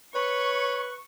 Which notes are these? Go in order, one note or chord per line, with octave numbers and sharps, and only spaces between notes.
B4 C#5 C#6